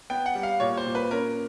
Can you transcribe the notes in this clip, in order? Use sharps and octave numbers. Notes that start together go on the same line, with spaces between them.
B3 G5
F#5
G3
F5
A#2 C#5
C5
A#2
B4
C#4 A#4